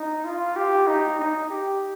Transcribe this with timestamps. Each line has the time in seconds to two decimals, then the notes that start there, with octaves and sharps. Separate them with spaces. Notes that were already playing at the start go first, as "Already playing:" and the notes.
Already playing: D#4
0.24 F4
0.56 G4
0.87 D#4
1.19 D#4
1.50 G4